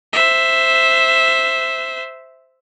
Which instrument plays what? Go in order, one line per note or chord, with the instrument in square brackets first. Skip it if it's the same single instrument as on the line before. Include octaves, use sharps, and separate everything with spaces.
[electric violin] C5 E5